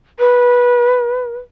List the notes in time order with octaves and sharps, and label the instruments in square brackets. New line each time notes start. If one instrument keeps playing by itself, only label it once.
[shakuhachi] B4